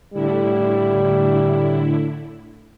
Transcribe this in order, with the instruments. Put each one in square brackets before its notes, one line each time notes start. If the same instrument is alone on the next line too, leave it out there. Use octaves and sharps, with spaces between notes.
[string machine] A2 D3 E4 [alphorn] G3